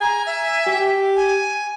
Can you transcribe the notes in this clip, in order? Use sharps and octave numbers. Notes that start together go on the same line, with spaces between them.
G#5 A#5
E5
G4
G#5